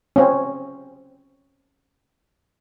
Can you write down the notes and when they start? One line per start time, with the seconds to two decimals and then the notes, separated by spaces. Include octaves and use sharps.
0.16 C4 C#4